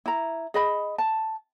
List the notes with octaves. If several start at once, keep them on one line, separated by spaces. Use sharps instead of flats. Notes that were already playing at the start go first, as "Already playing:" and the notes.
E4 A#5
G#4 D#5 B5
A5